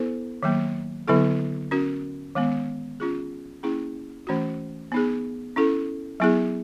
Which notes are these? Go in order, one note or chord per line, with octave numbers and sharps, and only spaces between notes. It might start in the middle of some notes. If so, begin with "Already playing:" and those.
Already playing: B3 E4 A4 C5
D#3 F#3 A#3
D3 F#3 B3 E4 A4
C#4 F#4 A#4
D#3 G#3 B3
C#4 F4 G#4
A#3 C#4 E4 G#4
E3 A3 C#4 F#4
B3 D#4 G#4
C#4 E4 A4
F#3 B3 E4 G#4